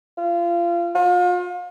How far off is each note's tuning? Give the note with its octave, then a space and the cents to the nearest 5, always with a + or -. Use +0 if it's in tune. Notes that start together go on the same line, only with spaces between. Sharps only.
F4 -25
F4 +40